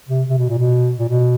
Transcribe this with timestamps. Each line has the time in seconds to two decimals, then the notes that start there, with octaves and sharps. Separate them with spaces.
0.08 C3
0.29 C3
0.38 B2
0.49 A#2
0.58 B2
0.99 A#2
1.09 B2